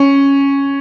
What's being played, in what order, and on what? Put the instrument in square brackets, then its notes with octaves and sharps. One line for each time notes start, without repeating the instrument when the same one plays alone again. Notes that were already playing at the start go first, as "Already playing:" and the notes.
Already playing: [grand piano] C#4